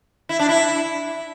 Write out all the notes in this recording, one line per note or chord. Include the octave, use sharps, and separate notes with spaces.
E4
D4
E4